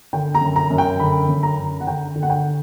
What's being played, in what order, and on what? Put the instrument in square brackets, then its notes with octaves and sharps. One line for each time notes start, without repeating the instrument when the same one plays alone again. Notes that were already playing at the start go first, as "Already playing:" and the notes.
[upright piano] D3 G5
A#5
F#2
A#5
F#2
G5
D3 B5
F#2
A#5
D3
F#5
D3 G5
D3
F#5
G5